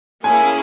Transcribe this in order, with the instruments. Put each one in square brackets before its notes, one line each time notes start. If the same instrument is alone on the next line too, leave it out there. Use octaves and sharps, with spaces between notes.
[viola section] A#3 C#4 E4 G#4 [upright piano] G#5